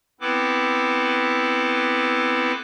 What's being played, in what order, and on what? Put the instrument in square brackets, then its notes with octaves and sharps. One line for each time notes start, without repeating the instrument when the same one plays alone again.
[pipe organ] B3 C4 E4 A4 B4 D6